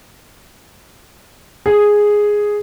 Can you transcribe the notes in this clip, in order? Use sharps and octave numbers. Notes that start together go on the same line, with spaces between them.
G#4